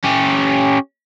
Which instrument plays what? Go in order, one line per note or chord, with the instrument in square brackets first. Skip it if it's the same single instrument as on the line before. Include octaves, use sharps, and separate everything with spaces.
[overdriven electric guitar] C#4 G4